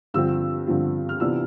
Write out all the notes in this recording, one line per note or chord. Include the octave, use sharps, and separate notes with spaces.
G2 D3 F3 C4 F4 E6
G2 D3 F3 C4 F4
F6
C3 E3 B3 D4 F4 E6